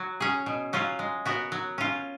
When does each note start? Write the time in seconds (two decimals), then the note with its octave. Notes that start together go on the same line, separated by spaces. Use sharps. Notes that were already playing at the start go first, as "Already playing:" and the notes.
Already playing: F#3
0.20 C#4 G#4
0.46 B2
0.73 F#3 C#4 F4
0.99 G#3
1.25 B3 F#4 A#4
1.52 F#3
1.78 C#4 F4